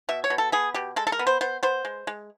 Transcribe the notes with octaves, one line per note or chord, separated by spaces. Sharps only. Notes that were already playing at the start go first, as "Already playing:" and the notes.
B2 E5
C#5
B2
A4
B3 G#4
B2 G4
G#3 A4
A4
A#4
B3
C5
B3 C5
B3 C5
G#3
G#3